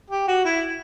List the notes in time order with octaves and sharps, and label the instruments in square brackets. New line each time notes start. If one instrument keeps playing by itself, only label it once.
[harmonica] G4
F#4
E4